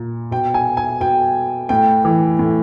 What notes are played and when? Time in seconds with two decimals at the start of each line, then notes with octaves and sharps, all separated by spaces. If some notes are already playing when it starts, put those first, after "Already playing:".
Already playing: A#2
0.31 B2 G5
0.54 G#5
0.77 G#5
1.00 B2 G5
1.69 A2 G5
2.05 E3
2.39 A2